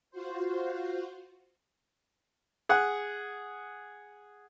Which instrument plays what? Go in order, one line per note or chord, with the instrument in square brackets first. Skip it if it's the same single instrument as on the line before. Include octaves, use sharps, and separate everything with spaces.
[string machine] F4 F#4 C5
[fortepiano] G#4 F#5